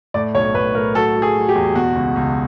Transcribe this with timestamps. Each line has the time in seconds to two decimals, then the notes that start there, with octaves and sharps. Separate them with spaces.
0.14 A2 D5
0.34 B1 C#5
0.55 A2 B4
0.75 A2 A#4
0.95 F#3 A4
1.16 F#3
1.22 G#4
1.35 F#3
1.49 G4
1.55 E2
1.75 B2 F#4
1.95 C#2
2.15 C#2